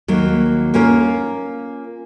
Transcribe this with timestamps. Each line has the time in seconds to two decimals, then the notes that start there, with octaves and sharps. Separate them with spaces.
0.08 D#2 F#3 A#3
0.74 A#3 C#4 F4 A#4